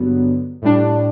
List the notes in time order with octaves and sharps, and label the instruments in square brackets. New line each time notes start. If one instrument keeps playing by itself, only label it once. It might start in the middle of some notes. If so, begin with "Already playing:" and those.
Already playing: [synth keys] G2 D3 F#3 B3
A2 G3 D4